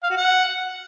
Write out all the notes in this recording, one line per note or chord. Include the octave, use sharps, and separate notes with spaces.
F5
F#4
F#5